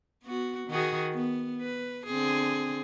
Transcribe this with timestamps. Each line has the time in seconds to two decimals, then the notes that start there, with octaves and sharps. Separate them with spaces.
0.24 B3 F#4
0.68 D#3 F#4 G#4
1.13 B3
1.61 B4
2.07 D3 C4 G#4